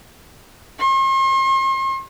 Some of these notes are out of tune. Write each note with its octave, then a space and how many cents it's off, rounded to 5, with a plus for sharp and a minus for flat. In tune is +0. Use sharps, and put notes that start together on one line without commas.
C6 +45